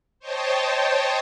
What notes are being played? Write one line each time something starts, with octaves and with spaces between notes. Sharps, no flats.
C5 C#5 D#5 G5 A5